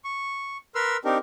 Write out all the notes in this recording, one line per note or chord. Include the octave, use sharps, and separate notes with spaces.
C#6
A#4 B4 C6 E6 F6
C4 D4 D#4 G4 A#4